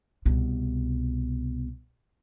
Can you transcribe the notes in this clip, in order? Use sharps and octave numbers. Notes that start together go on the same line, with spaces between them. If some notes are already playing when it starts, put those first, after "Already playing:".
C2 B2